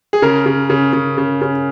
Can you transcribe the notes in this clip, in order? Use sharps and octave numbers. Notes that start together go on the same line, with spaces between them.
G#4
C#3 A#4
C#3
C#3
C#3
C#3
C#3